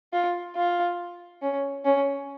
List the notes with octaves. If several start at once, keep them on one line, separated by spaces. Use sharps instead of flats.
F4
F4
C#4
C#4